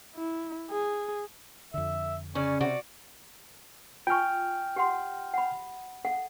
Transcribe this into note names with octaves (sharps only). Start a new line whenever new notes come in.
E4
G#4
F2 D3 E5
C#3 C#4 D5
C3 F#4 D5
F4 G5 G#5 C#6 F6
G4 F#5 C6
F#5 B5
A4 F5 F#5